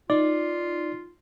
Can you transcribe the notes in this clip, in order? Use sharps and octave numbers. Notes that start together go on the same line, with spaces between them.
D#4 F4 D5